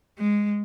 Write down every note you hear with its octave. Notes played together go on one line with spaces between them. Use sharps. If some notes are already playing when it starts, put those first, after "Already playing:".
G#3